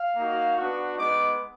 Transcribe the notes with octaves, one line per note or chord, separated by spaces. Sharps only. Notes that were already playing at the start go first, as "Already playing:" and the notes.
Already playing: F5
A#3 D#4 F#4
B3 D4 F#4
G#3 B3 D#4 D6